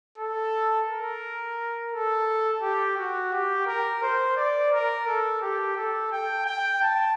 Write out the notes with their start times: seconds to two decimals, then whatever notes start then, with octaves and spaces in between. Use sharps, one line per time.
0.18 A4
0.87 A#4
1.92 A4
2.62 G4
2.97 F#4
3.33 G4
3.66 A#4
4.02 C5
4.36 D5
4.72 A#4
5.07 A4
5.41 G4
5.76 A4
6.12 G5
6.46 G5
6.82 A5